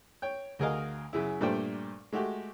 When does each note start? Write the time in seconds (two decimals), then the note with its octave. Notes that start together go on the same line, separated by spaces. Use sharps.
0.22 C#5 G5
0.59 D2 F#4 G#4 A#4 D#5 F5
1.13 F#2 C#3 E4
1.41 G2 A#2 A3 D4 C5 G5
2.12 G#3 A3 F#4 G4